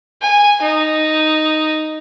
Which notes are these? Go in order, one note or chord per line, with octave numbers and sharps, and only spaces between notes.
G#5
D#4